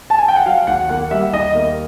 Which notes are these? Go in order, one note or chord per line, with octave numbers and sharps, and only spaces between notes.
A5
G#5
G5
F#5
F#3 F5
D#2 F#5
A#3 F#5
G3 E5
D#2 D#5
A#3